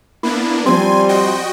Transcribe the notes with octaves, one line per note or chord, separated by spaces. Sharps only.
A#3 B3 D4 E4
F3 G3 C4 G#5 C6
F#4 D#5 G5